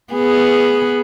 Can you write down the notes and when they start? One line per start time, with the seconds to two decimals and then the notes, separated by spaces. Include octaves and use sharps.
0.14 B3 G#4